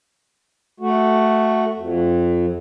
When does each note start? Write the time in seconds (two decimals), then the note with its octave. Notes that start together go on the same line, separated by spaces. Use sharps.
0.80 A3 F#4
1.77 F2